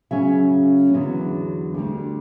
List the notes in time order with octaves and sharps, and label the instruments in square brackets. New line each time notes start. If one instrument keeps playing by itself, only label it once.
[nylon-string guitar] C#3 F#3 C#4 E5
E2 D3 F#3 B3
D2 D3 G3